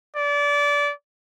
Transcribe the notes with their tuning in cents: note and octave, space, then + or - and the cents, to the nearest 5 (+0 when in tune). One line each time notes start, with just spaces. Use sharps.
D5 -25